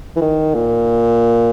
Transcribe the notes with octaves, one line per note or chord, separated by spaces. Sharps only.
E3
D#3
A#2